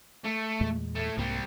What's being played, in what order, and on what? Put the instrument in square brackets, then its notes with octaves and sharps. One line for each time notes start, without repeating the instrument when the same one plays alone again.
[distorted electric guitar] A3
[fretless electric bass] E2 A#2 G#3
[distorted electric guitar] A2 A3
[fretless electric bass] C2 G#2 A#3 [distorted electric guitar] G3 C4